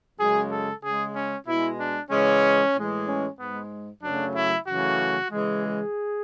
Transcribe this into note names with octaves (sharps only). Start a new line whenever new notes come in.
F#2 C#3 G#3 G#4
A4
C#3 G#3 G#4
C#4
B2 G#3 E4
D4
C#3 E3 G#3 C#4
A2 E3 G#3
C#4
G#2 G#3 B3
F#2 C#3 F#3 A3 D4
E4
F#2 C#3 E3 A3 F#4
C#3 E3 G#3
G#4